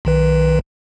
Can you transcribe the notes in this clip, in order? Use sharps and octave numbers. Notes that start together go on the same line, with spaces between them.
B1 D#3 B4